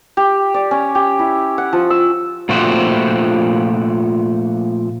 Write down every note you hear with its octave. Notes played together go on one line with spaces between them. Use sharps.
G4
D5
C#4
G4
E4
F#5
F3
E6
A#2 F3 A3 F#4 G4 C5